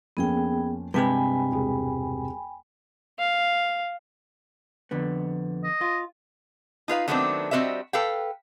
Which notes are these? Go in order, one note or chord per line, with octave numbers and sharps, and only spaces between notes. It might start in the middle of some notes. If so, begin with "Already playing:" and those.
F2 A#3 B3 C#4 G#4 G5
G2 C3 G#3 B4 G5 G#5 B5 B6
E1 G#4
F5
F2 D3 B3
D#5
F4
D#4 F4 B4 F5
D#3 F#3 A3 B3 C4 D4
G3 C4 F#4 B4 D#5 E5
A4 B4 F5 G5